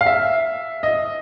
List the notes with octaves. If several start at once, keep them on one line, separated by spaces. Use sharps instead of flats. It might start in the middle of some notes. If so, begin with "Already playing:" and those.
F5
E5
D#5